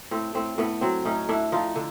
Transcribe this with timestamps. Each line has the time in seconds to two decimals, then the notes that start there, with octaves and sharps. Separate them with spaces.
0.11 A2 C4
0.35 A2 C4
0.58 A2 B3
0.81 F#3 C4
1.05 A2 C#4 D#4
1.29 A2 D4 E4
1.52 F3 D#4 F4
1.76 D3